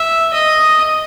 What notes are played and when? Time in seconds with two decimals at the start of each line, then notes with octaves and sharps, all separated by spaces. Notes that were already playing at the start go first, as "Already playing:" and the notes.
Already playing: E5
0.33 D#5